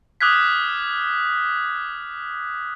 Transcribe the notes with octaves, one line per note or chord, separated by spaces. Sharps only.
D6 D#6 F6 F#6 G#6 B6